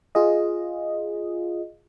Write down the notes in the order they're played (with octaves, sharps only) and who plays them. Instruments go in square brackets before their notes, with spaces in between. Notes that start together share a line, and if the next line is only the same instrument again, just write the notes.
[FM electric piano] F4 G#4 D#5